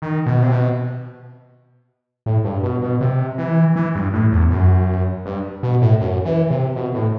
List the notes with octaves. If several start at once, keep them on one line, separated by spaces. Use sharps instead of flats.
D#3
B2
C3
B2
A2
G2
B2
B2
C3
E3
E3
G2
A2
E2
F#2
G2
B2
A2
F#2
E3
C3
B2
A2